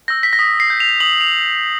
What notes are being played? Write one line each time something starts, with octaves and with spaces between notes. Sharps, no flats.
E6 G6 A#6
B6
A#6
D#6 B6
C7
G6
F7
D#6 F#7
F7